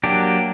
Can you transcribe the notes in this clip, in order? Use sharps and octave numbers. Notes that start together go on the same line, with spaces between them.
F#3 A#3 D4 G4